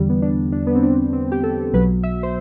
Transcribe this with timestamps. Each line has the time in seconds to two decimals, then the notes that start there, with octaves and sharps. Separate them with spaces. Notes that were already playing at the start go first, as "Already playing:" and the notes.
Already playing: E2 D3 G3
0.09 B3
0.22 D4
0.52 D4
0.67 B3
0.75 C4
0.83 D4
1.13 C4
1.32 G4
1.43 A4
1.73 B1 B2 F#3 B4
2.03 E5
2.23 C5